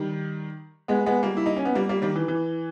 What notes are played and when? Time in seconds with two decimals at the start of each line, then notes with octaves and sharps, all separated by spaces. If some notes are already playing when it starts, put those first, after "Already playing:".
Already playing: D#3 G3
0.88 G#3 B3
1.06 G#3 B3
1.23 G3 A#3
1.37 E4
1.46 D#4
1.56 C#4
1.65 B3
1.75 G3 A#3
1.89 G3 A#3
2.02 D#3 G3
2.16 E3
2.28 E3